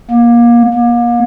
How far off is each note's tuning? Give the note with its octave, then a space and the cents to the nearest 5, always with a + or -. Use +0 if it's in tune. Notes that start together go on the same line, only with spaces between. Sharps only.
A#3 +25
A#3 +35